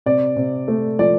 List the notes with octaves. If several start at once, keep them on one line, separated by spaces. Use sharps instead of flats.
C3 D5
C3
A3
F3 D5